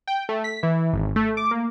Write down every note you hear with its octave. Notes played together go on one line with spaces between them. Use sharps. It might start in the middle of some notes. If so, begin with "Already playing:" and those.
G5
A3
B6
E3
G#1
A3
D6
A#3